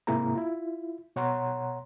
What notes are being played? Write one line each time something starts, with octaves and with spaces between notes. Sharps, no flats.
G#2 C3 A#3 E4 G#4 A#5
E4 F4
B2 C#5 F#5 A#5 C6